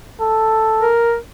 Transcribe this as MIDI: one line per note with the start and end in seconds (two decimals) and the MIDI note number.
0.20 0.89 69
0.82 1.16 70